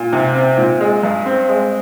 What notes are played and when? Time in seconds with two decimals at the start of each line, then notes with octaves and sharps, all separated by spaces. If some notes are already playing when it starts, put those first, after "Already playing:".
Already playing: A#2
0.13 C3
0.35 C4
0.58 A#2
0.81 G#3
1.03 G2
1.26 C4
1.49 G#3